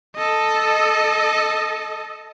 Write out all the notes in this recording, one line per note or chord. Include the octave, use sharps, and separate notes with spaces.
A4 D#5